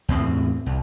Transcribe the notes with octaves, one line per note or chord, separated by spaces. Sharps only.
E2 A2 C4
C2